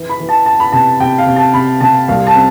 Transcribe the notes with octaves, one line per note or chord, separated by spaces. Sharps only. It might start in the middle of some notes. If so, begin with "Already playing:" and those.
Already playing: E3
B5
E3
A5
B3 A5
B5
C3 A5
C3 G5
F5
C3
A5
C3 B5
C3 A5
C2 F5
A5
C4